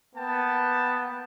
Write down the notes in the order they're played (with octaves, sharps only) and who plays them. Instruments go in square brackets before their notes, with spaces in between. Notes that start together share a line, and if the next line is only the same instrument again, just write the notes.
[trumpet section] A#3 G5 A5 [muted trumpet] B3